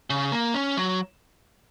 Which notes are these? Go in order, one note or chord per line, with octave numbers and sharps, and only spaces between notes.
C#3
A#3
C#4
F#3